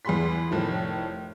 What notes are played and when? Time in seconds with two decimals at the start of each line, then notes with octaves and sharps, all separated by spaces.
0.05 E2 B3 G#4 B5 C6 B6
0.51 F1 A2 D#3 F3